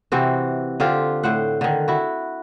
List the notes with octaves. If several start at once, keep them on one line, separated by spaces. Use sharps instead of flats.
C3 E3 C4 F#4
D3 C4 F4 G4
A2 C5 F#5
D3 D#3
E4 F#4